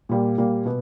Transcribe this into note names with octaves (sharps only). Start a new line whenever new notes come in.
A#2 G3 A#3
A#2 G3 A#3
B2 B3